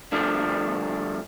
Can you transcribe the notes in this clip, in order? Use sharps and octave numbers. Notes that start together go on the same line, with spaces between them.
G2 D3 F3 A3 D4